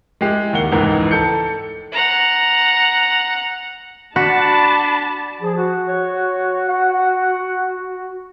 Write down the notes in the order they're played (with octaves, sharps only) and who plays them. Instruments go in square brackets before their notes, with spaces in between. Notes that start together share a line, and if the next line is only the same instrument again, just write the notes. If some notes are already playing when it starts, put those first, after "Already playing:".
[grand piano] G#3 E4 G4 C7
D#2 A#3 F#5 G7
F1 C#2 G#2 E3 A#4
A4 G6 C#7
[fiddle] F#5 A#5
[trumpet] D4 [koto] F#4 [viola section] A5 [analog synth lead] B5
[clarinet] F3 [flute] G#4
[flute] F#4
[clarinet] C#5
F#5